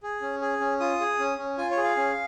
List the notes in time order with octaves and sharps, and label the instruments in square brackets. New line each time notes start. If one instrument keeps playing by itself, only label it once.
[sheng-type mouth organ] G#4
C#4
G#4
C#4
F4 D#6
G#4
C#4
C#4
F4 G#5
C#5
G#4
F5
C#4